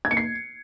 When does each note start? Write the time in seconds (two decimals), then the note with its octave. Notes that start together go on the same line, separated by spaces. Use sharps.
0.05 G#6
0.11 C#7
0.17 C7